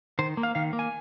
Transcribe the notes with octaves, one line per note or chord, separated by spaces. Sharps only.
D#3 C5
A#3
F5
D#3 F5
A#3
G#5